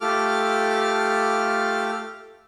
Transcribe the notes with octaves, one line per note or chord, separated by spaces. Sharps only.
A3 F4 G4 A4 D6 F6